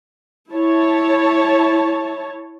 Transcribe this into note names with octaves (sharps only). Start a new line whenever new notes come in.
E4 C#5 A5